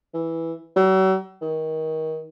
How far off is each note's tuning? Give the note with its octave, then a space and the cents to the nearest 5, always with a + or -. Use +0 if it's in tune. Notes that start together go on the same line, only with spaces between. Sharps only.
E3 -5
F#3 +40
D#3 +25